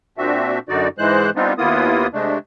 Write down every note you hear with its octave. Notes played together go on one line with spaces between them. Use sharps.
A#2 C4 D4 F#4 E5
F#2 D3 D#4 F#4 D5
G#2 E3 G#3 C5 F#6
G3 B3 C4 D4 D#4 F4
D#2 A#3 B3 E4 F4 D#6
C3 G#3 A3 D4